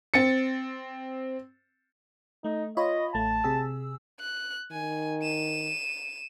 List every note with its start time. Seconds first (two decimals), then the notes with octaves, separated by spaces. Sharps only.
0.14 C4 A6 C#7
2.44 A3 D#4
2.77 F4 C#5 D#5 B5
3.15 A1 A3 A5
3.44 C3 G#4 E6
4.20 F#6
4.72 D#3 G#5
5.22 D#7 E7